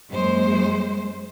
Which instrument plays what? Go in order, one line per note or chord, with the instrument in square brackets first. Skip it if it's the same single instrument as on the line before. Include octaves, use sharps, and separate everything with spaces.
[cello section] F#2 G#3 A#3 C5